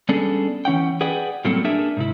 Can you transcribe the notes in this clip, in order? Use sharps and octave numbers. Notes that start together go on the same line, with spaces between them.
G3 B3 C#4 D4 G#4 A4
E3 C#4 F#5 G5
G#4 B4 D5 F#5 G5
A2 F#3 G3 A#3 C4 A4
D4 G#4 A#4 E5
G#2 C3 E4